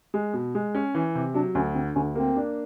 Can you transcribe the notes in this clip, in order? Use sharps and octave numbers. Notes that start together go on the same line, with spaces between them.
G#3
B2
G#3
C#4
E3
C3
F#3 D4
D2 C#4
D3 C4
D2 C#4
A#3 C4
D4